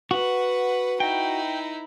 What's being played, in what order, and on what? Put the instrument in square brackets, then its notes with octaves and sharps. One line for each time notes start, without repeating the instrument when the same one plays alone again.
[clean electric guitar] F#4 [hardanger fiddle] B4 F#5
[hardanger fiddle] D#4 E4 [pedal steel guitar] G5